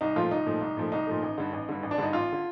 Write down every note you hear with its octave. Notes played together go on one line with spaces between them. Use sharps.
C2 D#4
A#2 F3 A3 F4
C2 D#4
A#2 F3 A3
C2
A#2 F3 A3
C2 D#4
A#2 F3 A3
A1
G2 D3
A1
G2 D3
A1
D4
G2 D3 D#4
A1 F4
D3